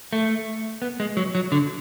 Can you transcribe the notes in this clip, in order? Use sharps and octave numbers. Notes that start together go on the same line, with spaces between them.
A3
B3
G#3
F#3
F#3
D3